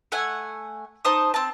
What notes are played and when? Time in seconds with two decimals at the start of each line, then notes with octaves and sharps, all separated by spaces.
0.12 A3 F#5 G#5
1.05 D#4 C5 A5 D#6
1.34 C4 A5